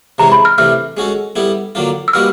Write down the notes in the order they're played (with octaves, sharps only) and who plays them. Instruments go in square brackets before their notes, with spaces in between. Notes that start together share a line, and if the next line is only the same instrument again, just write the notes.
[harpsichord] C3 E3 G#3 C#4 [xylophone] A#5
[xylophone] B5
F6
[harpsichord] C3 E3 A3 D4 [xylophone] F6
[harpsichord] G#3 C#4 F#4 A4
G3 B3 E4 A4
D3 F#3 A#3 D4 F4
[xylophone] E6
[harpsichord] G3 A#3 D#4 F#4 B4 [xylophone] F6